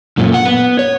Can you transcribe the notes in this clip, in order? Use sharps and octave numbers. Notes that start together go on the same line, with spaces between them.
F#2 A#2
F#5
B3
C#5